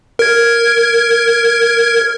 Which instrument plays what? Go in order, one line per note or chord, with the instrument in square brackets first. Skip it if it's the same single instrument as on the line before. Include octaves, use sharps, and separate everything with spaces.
[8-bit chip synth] A#4 G#6